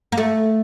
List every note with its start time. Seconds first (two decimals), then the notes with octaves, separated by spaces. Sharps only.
0.12 A#3
0.18 A3